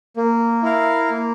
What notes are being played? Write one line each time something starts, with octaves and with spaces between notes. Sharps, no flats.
A#3
E4 A#4 F5
A#3